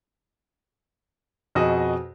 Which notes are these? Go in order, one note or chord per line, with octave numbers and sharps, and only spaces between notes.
F2 B2 F#4 G#4 D#5 D#6